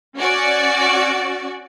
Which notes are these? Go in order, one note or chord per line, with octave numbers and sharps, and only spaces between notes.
C#4 F#4 D5